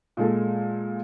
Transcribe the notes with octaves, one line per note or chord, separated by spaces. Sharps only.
A#2 G#3 A4